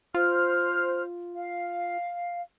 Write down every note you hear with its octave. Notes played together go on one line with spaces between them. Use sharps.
F4 C5 F6
F5